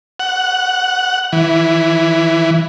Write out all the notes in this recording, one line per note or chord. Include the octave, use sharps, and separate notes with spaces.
F#5
E3